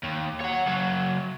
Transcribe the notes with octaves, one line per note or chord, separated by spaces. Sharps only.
D#2
C#5 F#5
C#3 F#3